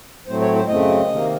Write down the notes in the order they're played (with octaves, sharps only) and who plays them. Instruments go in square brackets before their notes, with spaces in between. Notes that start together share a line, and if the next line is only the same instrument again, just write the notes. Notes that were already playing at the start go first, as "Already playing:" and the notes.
[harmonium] A2 F#3 A3 C4 C5
C#5
C5
F#2 C#3 A3 C4 D#5
C3 D#3 A#3